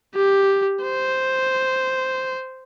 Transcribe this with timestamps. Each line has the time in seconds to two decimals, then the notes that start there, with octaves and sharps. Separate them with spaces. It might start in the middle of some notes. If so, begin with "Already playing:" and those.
0.15 G4
0.83 C5